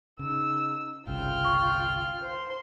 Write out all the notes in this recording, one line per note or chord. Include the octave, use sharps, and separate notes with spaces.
C#3 D#4 E6
G1 C2 C#3 F4 G5 F6
C#6
C5 C6